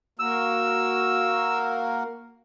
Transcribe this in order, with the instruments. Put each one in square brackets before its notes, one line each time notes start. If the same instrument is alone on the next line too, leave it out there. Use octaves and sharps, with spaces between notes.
[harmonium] A#3 F#4 A#4 [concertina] E6